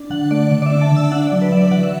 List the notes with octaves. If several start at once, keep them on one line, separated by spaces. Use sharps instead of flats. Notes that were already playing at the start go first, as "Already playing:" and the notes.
Already playing: D4
D3 F#5
A3 D5
D3 D5
D5
E5
D4
A5
D3
E6
D4 F#5
D5
F#3
B4
F#3 E5
D5
E3 F#5
E5